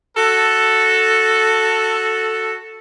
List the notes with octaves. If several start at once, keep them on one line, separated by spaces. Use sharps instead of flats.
F#4 A4